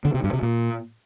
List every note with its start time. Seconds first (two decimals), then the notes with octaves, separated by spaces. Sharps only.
0.05 D3
0.14 C3
0.24 G2
0.33 C3
0.43 A#2